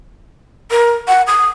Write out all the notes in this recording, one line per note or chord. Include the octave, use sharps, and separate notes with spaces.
A#4
F#5
D#6